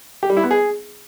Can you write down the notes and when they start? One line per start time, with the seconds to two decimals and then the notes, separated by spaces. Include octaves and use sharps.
0.23 G4
0.30 G3
0.37 E4
0.44 B3
0.51 G#4